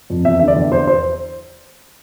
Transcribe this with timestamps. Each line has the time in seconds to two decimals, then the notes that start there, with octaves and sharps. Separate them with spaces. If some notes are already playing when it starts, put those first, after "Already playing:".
0.10 F2
0.25 E2 E5
0.39 D3 E5
0.48 D5
0.56 E2
0.72 E2 C5
0.87 C5